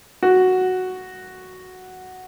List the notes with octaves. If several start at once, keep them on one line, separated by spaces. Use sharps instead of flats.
F#4